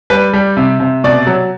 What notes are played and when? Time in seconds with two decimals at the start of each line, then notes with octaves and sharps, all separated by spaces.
0.10 G3 B4
0.33 G3
0.57 C3
0.80 C3
1.04 B2 D5
1.27 F#3